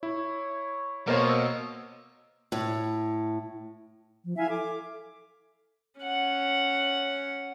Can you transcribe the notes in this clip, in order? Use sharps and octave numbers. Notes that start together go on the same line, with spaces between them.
E4 C#5
B2 A#3 A#4 C5 C#5
E6
A2
F3
E4 E5 F5 G#5
A4 D6
C#4 F#5